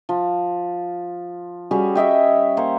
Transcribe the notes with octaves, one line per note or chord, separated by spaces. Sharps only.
F3
G3 C#4 F#4 G#4
C#5 D#5 E5 G5
A#3 C5 C#5